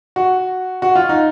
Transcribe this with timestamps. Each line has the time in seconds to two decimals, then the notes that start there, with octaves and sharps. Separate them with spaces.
0.16 F#4
0.82 F#4
0.96 F4
1.09 D#4